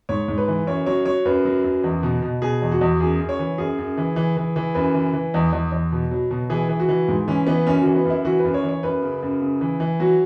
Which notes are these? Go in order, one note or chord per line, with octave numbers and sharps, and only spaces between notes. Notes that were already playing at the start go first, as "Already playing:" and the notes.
G#2 C#5
G#2
B4
E3
F#2 C#5
F#3 C#5
F#3 C#5
F#2 B4
F#3
F#2
E2
B2
B2
B2 G#4
E2
F#4
E2
F#2 G#4
F#2
C#5
E3
F#2 G#4
F#2
E3
E3
E3
E3
F#2 B4
E3
E3
E2
E2
E2
B2
F#3
B2
E3 G#4
E3
F#4
E3
G#2
E3 C#4
E3 B3
F#2 C#4
E3 F#4
B3
F#2 E4
E3 F#4
B4
F#2
C#5
E3
C#5
F#2 B4
C#3
F#2
C#3
E3
E3
F#3 F#4